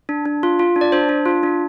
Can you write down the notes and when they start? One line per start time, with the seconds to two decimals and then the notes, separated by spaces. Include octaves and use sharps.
0.09 D4
0.25 D4
0.43 F4
0.59 F4
0.76 D4
0.81 D5
0.92 D4 C5
1.09 D4
1.26 F4
1.43 D4